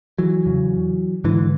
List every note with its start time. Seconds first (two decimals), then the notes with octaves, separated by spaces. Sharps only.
0.18 E3 F#3
0.46 E2 C#3
1.24 G#2 D3 E3